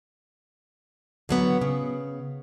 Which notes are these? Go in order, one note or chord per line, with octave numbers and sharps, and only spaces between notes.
D3 F#3 B3
C#3